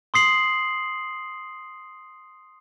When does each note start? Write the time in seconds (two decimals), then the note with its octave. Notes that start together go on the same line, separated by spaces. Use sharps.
0.14 C6 D#6 C7 F#7